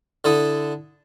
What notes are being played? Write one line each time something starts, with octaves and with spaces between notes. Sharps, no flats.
D3 E4 A4 D#6